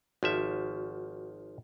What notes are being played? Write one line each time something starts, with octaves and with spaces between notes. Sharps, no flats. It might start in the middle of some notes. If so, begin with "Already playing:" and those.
G#1 F3 F#4 E5